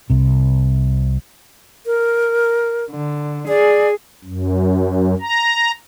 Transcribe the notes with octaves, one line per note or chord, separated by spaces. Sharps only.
C2 C3
A#4
D3
G#4 D5
F#2
A#5